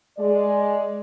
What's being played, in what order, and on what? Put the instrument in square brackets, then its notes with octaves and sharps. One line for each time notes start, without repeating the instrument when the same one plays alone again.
[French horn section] G#3 D5